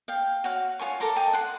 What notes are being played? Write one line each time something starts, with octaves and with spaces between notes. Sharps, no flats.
F5 G5
F#4 C#5 F5
F4 C#5 G#5 C#6
A4 A#4 A#5 D6
D#5 G5 A5
F#5 C6